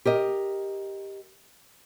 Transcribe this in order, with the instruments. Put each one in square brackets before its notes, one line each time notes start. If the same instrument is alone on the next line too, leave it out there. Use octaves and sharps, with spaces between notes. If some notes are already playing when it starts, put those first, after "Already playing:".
[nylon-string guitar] G4 A#4 D#5